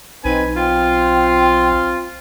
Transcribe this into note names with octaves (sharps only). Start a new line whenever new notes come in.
B1 C4 D#4 B4 G#5
C4 F4 G5